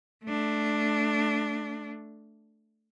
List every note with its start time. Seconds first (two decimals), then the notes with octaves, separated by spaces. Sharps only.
0.24 A3 D4